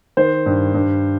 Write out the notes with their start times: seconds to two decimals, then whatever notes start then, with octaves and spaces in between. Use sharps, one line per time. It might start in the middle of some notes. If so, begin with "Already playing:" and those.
0.17 D#3 C5
0.46 G2
0.74 G2